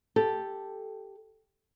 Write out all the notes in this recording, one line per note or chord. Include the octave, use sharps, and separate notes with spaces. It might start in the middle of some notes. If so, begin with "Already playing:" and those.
G4 A4